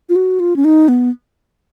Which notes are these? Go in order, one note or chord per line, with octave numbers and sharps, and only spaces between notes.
F4
F#4
F4
C#4
D#4
B3